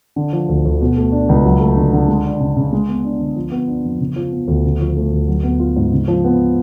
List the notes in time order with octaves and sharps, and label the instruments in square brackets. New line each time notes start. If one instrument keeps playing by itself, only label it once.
[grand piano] D3
F3
D2
D2
B2
A3
D4
C#2
F#3
A3
D3
D3
G#3
D4
C#3
C#3
G#3
B3
D4
D3
F3
B3
D4
F2
C#3
F3
B3
D2
C#3
F3
A3
D2
F#3
B3
F4
G#2
C#3
F3
B3